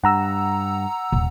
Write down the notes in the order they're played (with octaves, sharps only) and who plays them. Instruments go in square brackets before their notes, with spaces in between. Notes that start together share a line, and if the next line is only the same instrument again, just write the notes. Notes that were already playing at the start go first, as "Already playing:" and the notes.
[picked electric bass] G2 [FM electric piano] F#5 A#5 E6
[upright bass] D#1